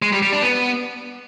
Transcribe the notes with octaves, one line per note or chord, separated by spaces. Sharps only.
G#3
G3
G3
D4
B3